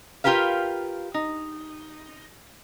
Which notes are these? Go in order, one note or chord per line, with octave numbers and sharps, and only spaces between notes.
F4 G4 A#4 B4 F5
D#4